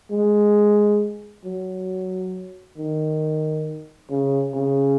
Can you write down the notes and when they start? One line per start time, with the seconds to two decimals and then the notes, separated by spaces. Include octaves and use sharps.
0.11 G#3
1.45 F#3
2.78 D#3
4.10 C#3
4.55 C#3